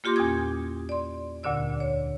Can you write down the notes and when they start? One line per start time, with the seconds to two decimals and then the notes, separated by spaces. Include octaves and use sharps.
0.04 A#3 F4 G4 C6 D6 A#6
0.16 E2 A#2 C#4 D#6 G#6
0.89 D5 C6
1.43 D2 G2 A#2 D3 D5 E6
1.80 C#5